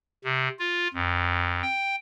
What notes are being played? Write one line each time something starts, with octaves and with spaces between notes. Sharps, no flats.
C3
F4
F2
G5